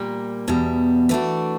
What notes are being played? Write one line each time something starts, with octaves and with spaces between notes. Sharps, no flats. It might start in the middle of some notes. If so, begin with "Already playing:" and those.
Already playing: A#2 G3 A#3
E2 B2 G3
E3 A3 D4 F#4